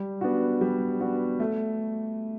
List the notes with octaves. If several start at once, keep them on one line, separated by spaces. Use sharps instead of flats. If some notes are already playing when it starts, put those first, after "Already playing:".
Already playing: G3
B3 D4 F#4
G3
B3 D4 F#4
A3